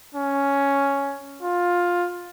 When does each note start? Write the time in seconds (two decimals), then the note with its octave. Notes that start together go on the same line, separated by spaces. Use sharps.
0.14 C#4
1.42 F4